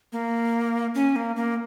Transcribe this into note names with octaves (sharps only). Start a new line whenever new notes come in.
A#3
C#4
A#3
A#3